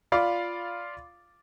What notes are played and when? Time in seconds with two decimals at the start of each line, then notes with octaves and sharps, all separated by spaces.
0.12 F4 D5 F5 B5